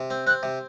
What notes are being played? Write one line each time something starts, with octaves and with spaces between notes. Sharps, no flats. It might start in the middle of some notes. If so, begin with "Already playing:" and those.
Already playing: C3
C4
C4 F#6
C3